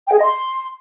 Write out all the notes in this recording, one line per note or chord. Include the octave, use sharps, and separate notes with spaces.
G5
G#4
D#5
C6